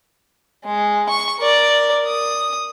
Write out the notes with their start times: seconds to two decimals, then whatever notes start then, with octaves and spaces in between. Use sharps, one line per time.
0.65 G#3
1.09 C#6
1.39 A#4 D5
2.06 D#6